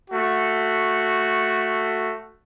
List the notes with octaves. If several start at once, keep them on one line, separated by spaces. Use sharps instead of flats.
A3 F#4